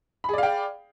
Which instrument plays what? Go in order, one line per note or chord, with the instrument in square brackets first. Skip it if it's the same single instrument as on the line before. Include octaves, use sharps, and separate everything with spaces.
[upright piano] B5
G#4
D5
F5
G5